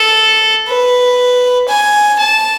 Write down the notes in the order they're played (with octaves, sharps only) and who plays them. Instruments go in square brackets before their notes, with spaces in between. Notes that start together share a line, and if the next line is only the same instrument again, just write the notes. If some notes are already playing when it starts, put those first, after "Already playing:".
Already playing: [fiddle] A4
B4
G#5
A5